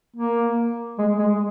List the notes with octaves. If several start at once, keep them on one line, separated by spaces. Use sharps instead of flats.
A#3
G#3
G#3